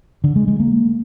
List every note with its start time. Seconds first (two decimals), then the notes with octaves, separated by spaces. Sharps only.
0.24 D3
0.36 G#3
0.48 G#3
0.60 A#3